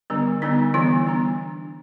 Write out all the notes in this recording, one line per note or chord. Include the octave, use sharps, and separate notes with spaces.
D3 G3 B3 D4
D3 G3 B3 D4 D#4
E3 G3 B3 D4 E4
G3 B3 D4